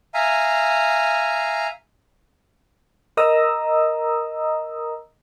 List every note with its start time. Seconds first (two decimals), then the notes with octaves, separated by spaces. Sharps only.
0.14 E5 F5 G#5 A#5
3.17 A#4 D#5 A#5 D#6 E6